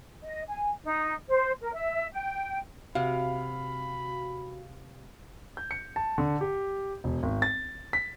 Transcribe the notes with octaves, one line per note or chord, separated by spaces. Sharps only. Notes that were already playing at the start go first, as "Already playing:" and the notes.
D#5
G#5
D#4
C5
A#4
E5
G5
C3 F#4 F5 B5
G6
C#7
A5
D3
G4
E1
G#1
A6
B6